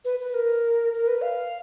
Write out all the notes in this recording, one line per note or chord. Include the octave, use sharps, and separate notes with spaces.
B4
B4
A#4
A#4
B4
F5